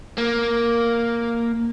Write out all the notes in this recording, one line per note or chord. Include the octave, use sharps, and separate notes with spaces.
A#3